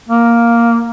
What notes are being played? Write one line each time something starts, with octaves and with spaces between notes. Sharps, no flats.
A#3